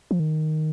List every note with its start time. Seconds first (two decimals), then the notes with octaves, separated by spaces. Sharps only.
0.11 F3
0.20 D#3